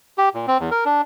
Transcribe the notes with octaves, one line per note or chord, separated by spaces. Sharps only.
G4
A#2
C4
E2
A#4
D4